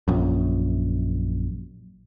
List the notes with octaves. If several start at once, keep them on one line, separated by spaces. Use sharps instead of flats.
A#1 F#2